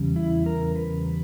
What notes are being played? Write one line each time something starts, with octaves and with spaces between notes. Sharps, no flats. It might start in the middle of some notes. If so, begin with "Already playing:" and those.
Already playing: E2 C#3 G3
E4
A#4
B4